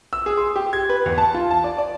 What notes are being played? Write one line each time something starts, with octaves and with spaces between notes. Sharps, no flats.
E6
G#4
C6
G4
G#6
B4
E2
A5
F4
A5
D5
D5